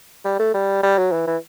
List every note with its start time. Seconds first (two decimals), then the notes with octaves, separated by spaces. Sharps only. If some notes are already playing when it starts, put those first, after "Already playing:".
0.25 G3
0.39 A3
0.54 G3
0.83 G3
0.98 F#3
1.12 E3
1.27 E3